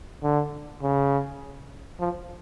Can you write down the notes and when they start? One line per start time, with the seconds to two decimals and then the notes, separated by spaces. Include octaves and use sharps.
0.23 D3
0.83 C#3
2.00 F3